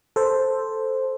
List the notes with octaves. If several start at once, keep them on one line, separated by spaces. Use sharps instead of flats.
A4 C5